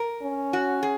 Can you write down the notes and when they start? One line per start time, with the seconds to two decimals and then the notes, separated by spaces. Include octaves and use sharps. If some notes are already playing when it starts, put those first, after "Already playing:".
Already playing: A#4
0.22 C#4
0.53 F#4
0.83 G#4